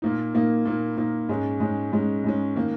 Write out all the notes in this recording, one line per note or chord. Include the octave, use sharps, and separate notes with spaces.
A#2 A#3 D#4
A#2 A#3 D#4
A#2 A#3 D#4
A#2 A#3 D#4
G#2 G#3 C#4
G#2 G#3 C#4
G#2 G#3 C#4
G#2 G#3 C#4
D#3 A#3